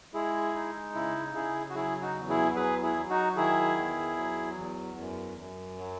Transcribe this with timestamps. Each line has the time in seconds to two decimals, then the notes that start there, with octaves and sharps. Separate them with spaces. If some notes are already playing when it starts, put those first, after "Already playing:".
0.14 G#3 E4 G#4
0.54 D#4
0.95 C#3 E4
1.34 C#3 E4 G#4
1.70 F#4
1.75 F#3 E4 G#4
2.02 D#4 F#4
2.15 E2
2.29 E4 G#4
2.56 F#3 G#4 B4
2.82 E4 G#4
2.96 F#3
3.10 D#4 F#4
3.36 D#3 E4 G#4
3.77 E2
4.17 F#3
4.58 E2
4.98 F#2
5.38 F#2
5.79 F#3